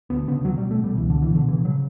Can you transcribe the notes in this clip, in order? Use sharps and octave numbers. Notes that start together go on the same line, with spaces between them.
D2 B3
C#3 B3
B2 F#3
G3
B2
A3
B2 G3
C#2 E3
D3
B2
E3
B2 D3
C#3 E3
C#3 F#3